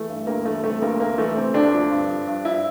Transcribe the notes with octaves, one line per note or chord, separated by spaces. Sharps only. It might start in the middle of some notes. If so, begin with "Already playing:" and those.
Already playing: E3 A3
G2
D2 A#3
E3 A3
C3 A3
D2 A#3
D2 A#3
E3 A3
C3 C4
D2 D4
F3
G2
F3
G2
F3 E4